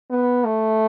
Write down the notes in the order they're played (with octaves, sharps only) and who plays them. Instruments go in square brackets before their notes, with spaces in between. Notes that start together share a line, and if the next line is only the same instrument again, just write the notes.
[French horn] B3
A3